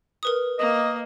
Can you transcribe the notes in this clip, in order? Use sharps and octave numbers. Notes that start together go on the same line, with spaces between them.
A#4 B4 D#6
A#3 D#5